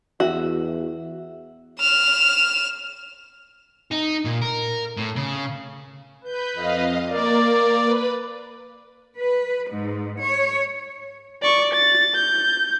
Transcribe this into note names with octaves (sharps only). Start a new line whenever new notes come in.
E2 F#4 E5
F6 E7
D#4
A#2
A#4
A2
C#3
B4 G6
F2 D#5 F5
A#3 A#4 D5
B4 B5
B4
G#2
C#5
D5 C#6
A6
G6